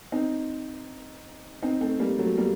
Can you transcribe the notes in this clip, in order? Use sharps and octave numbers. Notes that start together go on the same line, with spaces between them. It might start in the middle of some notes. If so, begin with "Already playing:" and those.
C4 D#4
C4 D#4
A3 C4
G3 A#3
F#3 A3
G3 A#3